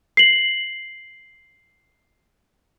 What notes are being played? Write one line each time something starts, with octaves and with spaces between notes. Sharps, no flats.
C7 F#7